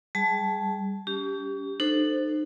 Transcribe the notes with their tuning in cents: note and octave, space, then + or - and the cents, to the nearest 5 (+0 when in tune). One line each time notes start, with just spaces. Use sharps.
G3 +0 G#4 +0 A5 -15
C#4 +40 G4 +0
D#4 -45 A4 +0 C5 +0